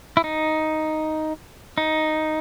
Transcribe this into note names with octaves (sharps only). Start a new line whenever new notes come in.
E4
D#4
D#4